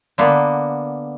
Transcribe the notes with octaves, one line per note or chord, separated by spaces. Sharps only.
D3 A#3 B3